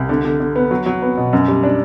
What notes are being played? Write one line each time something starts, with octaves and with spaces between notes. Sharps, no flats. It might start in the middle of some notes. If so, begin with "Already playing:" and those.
Already playing: C2
D3
D3
D3
B3
F#3
F#3
B3
B2
F#2
G3
D4